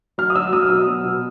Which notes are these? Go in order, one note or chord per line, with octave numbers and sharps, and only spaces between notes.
F#3 F6
D#6
F#3 E6
F#3 D#6
F6
B2 E6
F#3
B2